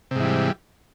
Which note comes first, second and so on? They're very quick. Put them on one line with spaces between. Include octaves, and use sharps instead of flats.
C3 G#2 E3 G3